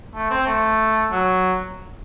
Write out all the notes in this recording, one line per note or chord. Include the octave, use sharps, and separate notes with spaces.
A3
C4
A3
F#3